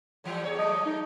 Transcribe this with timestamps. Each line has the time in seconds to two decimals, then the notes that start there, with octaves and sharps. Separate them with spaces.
0.24 A2 E3 G3
0.44 E2 G#4 C#5
0.58 F#3 A3 D#5
0.86 D#4